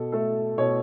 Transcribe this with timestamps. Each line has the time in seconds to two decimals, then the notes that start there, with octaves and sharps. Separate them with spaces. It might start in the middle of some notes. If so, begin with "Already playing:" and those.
Already playing: B2 A4
0.12 A3 A4
0.58 B2 C#5